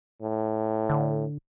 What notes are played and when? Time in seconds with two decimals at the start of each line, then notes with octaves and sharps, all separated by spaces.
0.22 A2
0.90 D3